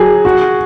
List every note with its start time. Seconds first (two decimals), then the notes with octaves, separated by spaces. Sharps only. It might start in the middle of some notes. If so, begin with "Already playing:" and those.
Already playing: F#3 G#4
0.25 F#4